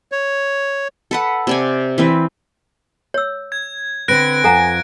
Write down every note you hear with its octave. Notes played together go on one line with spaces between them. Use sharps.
C#5
A4 B4 F#5
C3 D5 G#5
E3 C4 B4
C#5 E6
G#6
D3 C4 B4 F#6 A#6 D7
F2 F4 A4 F#5 G#5 A#5